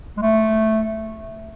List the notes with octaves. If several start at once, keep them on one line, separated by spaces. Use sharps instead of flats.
G#3
A3